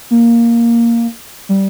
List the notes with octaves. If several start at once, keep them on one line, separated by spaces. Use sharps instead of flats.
A#3
G3